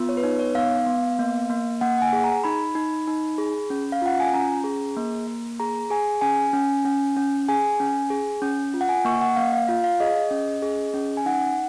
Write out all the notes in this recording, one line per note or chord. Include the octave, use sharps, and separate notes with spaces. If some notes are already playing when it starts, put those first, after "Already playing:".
Already playing: B3 F4
C#5
B4
D#4 C#5
C#5
B3 F5
B3
A#3
A#3
A#3 F#5
F#5
G#5
G#4
A#5
D#4 B5
D#4
D#4
G#4
C#4
F5
F4 F#5
G#5
C#4 A#5
G#4
A#3
A#3
G#4 A#5
G#4 G#5
C#4 G#5
C#4
C#4
C#4
G#4 G#5
C#4
G#4
C#4
F4
F#5
G#5
A#3 C#6
F#5
A#3 F5
F5
F4 F5
F5
G#4 D#5
C#4
G#4
C#4
G#5
D#4 F#5